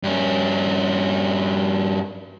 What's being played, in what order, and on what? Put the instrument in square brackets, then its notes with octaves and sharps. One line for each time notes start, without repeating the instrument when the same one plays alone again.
[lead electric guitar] G2 C#4